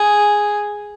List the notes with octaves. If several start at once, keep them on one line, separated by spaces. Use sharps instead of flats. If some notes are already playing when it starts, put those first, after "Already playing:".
Already playing: G#4